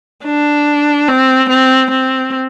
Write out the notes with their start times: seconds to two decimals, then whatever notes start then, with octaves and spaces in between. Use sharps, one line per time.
0.25 D4
1.08 C4
1.49 C4
1.91 C4